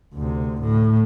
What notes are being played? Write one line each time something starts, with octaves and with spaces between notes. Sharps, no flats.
D2 C3
A2